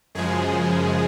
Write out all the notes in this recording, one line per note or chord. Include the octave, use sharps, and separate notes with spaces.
F#2 C#3 F3 G#3 G#4